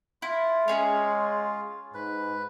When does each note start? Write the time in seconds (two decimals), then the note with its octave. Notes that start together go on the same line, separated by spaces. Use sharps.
0.22 E4 F4
0.68 G#3 C#4 G#4 C#5
1.94 G#2 B4